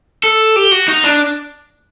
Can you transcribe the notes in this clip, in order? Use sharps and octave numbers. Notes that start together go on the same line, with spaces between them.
A4
G4
F#4
D#4
D4